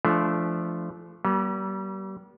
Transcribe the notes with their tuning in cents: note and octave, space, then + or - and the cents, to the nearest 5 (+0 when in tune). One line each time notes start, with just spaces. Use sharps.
F3 -25 A3 -20 D4 +0
G3 -35 A#3 +40